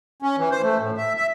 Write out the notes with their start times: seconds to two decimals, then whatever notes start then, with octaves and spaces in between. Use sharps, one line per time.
0.22 C#4
0.38 E3
0.51 C5
0.63 A3
0.79 A2
0.97 E5
1.17 E5